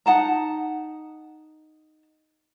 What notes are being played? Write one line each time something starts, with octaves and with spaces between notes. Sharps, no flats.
D#4 F#5 A5 A#5